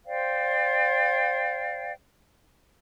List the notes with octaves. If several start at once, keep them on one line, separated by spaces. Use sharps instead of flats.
C5 D5 F5 G5